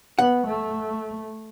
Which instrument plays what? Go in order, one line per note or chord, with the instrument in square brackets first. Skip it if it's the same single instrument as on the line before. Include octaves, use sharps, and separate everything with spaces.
[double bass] B3 [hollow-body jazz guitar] F#5
[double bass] A3